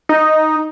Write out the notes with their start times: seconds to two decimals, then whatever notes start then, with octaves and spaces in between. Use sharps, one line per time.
0.09 D#4